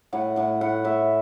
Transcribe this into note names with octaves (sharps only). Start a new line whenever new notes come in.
A2 F#5
A2 F#5
A2 F#5
A2 E5